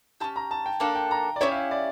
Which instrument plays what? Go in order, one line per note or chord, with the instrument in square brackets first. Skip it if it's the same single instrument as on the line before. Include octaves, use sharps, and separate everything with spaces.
[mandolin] C#4 E4 G4 [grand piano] A5
[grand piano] A#5
A5
G5
[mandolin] A#3 D4 A4 [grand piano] F5
[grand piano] G5
A#5
D5
[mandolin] C#4 E4 G4 [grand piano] C#5
[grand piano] F5
E5
D5